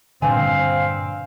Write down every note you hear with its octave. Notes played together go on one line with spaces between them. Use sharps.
G2 A#2 D3 C4 D4 B4 F5 G#5